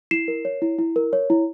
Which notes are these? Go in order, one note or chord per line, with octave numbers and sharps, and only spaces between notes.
E4 C7 E7
A#4
C#5
E4
E4
A#4
C#5
E4